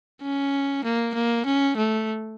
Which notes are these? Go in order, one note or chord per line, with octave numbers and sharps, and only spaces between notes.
C#4
A#3
A#3
C#4
A3